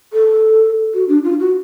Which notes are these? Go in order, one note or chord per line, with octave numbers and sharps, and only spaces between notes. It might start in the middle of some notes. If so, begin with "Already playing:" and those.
A4
F#4
D4
F4
F#4